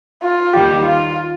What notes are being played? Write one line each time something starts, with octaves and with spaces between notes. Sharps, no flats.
F4
D#2 D#3 G3 G4
F4